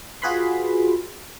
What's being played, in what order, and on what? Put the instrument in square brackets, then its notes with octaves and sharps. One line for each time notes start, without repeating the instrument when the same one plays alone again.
[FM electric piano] F4 F#4 G#4 B4 B5 C6